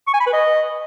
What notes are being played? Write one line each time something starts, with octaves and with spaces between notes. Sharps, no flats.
C#6
G#5
B5
B4
D#5